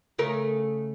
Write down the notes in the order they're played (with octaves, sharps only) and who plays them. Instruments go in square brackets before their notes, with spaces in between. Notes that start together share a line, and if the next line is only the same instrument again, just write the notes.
[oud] C#3 A3 A#4